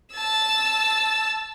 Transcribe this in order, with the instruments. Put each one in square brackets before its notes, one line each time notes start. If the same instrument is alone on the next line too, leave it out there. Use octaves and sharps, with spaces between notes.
[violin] A5 E6